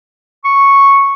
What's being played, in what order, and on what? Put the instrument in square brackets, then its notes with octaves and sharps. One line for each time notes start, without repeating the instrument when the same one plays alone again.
[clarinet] C#6